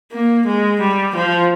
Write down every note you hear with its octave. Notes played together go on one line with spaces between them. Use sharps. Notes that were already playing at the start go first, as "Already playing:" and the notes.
A#3
G#3
G3
F3